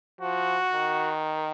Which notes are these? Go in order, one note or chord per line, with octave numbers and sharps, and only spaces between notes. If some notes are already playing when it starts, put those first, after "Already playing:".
F3 F#4
D#3